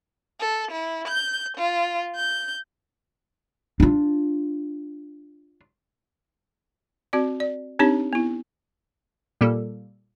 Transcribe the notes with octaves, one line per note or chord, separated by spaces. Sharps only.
A4
E4
G6
F4
G6
D4 F4
C4 F#4 D5
D5
C4 D4 D#4 G4 C#5
B3 E4
A#2 G3 A#3 A4